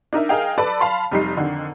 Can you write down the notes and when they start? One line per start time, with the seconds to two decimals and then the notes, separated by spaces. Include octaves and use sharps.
0.13 D4 D#4 A#4 E5
0.29 G#4 A#4 D#5 F5 G5
0.58 A4 B4 D5 A5 B5
0.80 F5 A5 B5 C6
1.11 F1 G3 D#4 C7
1.36 F2 D3 D#3